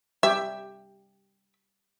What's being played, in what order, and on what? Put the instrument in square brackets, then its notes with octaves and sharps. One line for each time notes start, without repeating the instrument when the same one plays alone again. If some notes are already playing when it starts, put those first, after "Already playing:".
[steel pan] G3 G4 [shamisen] E5